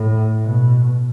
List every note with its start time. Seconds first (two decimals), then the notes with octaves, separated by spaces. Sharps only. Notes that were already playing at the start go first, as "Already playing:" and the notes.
Already playing: A2
0.43 B2